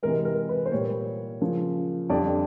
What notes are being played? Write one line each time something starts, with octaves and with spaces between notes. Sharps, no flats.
C3 E3 G#3 A#4
A#4
B4
C5
A#2 G3 A#3 C#5
C#3 F3 A#3
F2 D3 G3 D5